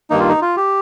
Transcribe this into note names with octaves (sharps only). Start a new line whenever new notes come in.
G2 D#3 A#3 D#4
F4
D#4
F4
G4